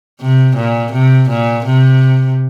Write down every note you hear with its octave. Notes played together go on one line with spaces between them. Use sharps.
C3
A#2
C3
A#2
C3